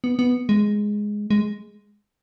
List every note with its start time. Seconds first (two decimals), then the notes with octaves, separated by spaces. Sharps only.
0.04 B3
0.19 B3
0.49 G#3
1.30 G#3